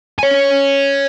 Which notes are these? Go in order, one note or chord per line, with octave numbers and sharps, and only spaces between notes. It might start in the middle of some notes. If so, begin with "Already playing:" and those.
C#5 G#5